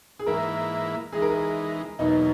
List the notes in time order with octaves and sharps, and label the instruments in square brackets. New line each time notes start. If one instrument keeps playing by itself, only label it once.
[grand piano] G#4
[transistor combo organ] G#2 E3 A#3 E4 [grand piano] A#4
[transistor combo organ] E3 G#3 D#4 [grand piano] G#4
[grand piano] A#4
G#4
[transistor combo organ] E2 B2 F#3 A#3 [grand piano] D#4